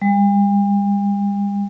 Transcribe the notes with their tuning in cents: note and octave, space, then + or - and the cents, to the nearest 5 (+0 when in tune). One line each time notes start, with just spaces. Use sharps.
G3 +45